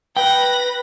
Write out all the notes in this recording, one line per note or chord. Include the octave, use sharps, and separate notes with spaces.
B4 G5 B5 A#6